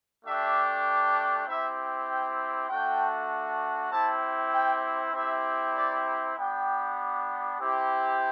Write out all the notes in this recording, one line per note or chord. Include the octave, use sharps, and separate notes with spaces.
A3 D4 G4 E5
C4 E4 G4 E5
G5
A3 D4 F#4 G5
C4 E4 G4 A5
G5
C4 E4 G4 E5
D5
B3 D4 G4 G5
C4 E4 G4